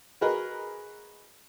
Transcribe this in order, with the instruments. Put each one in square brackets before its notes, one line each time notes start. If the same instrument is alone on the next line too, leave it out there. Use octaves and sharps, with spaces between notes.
[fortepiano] F#4 G#4 A#4 B4 D#5